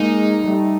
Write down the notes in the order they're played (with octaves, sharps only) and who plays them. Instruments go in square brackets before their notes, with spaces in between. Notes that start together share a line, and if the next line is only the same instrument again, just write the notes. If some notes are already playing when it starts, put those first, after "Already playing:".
Already playing: [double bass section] G#3 A#3 [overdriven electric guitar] D#4
[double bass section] G3 A3